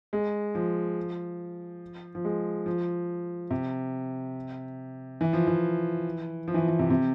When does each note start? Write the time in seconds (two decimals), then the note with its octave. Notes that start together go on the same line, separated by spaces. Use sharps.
0.13 G#3
0.55 F3
2.15 F3
2.25 G#3
2.66 F3
3.51 C3
5.21 E3
5.33 F3
5.47 E3
6.48 F3
6.54 E3
6.58 F3
6.68 E3
6.79 C3
6.90 C3